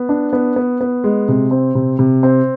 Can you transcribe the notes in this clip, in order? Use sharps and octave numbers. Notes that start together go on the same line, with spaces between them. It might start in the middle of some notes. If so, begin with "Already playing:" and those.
Already playing: B3
D4
B3
B3
B3
G#3
C3
C4
C3
C3
C4